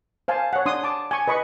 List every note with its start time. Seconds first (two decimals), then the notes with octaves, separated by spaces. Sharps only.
0.28 C5 F5 G#5 A5
0.53 C#5 F#5
0.66 D4 C6 D#6
0.84 A5 D6
1.11 G#5 C#6
1.28 B4 D#5 B5 C#6